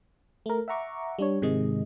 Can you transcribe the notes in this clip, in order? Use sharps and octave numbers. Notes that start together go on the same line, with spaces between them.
A3 A#4
E5 F#5 A#5 C#6 D6
G3 D4 C#5
G#2 C3 D#3 G#3 D#5